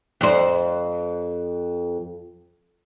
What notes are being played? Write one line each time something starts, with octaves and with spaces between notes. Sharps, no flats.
F2 C5